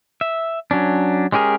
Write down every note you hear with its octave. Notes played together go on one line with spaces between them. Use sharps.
E5
F#3 C#4 D4
G#3 C#4 G4 G#4 A#4